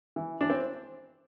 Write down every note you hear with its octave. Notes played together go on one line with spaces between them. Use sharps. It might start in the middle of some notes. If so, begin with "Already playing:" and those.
E3
E3 D4
C4